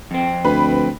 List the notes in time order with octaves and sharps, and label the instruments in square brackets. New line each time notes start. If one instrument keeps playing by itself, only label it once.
[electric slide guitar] F2 C4
[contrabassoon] D2 [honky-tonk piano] B4 B5